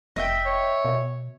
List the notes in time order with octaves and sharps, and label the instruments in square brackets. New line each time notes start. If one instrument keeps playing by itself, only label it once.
[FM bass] F1 [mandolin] D#5 E5 G5
[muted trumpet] C#5
[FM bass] B2